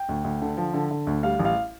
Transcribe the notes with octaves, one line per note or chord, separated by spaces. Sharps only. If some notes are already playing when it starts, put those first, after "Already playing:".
Already playing: G5
D2
D2
D3
F3
D3
D3
D2
G3 F5
A1
F5